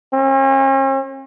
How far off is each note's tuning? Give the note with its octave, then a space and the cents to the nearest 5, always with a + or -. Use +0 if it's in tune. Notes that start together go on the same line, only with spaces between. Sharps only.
C#4 -45